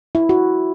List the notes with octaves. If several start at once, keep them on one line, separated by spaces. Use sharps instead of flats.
E4
F#4